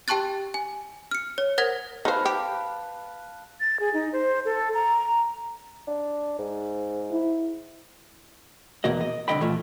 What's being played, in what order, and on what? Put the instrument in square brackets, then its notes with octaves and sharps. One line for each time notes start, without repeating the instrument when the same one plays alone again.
[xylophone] G4 G5 A5 C#6 F#6 A6
G#5
F6 C#7
C#5
A#4 C5 F#5 G#6 A#6
[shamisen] D#4 C5 [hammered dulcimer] B4 F5 A5
[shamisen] G4
[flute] A6
G#4
D#4
C5
A4
A#5
[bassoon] D4
G#2
[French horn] E4
[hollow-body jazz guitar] E2 B2 A#3 F#4 D#5
D#5
C2 D3 D#3 D#5 G5 B5
A#2 E3 A3 F4